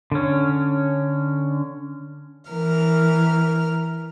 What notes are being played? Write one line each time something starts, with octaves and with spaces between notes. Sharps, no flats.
D3 C#4
E3 A#4 F6